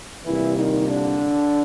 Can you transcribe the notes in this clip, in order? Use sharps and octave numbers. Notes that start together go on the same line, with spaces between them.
C2 A#2 E3 E4
D#3 D#4
D3 D4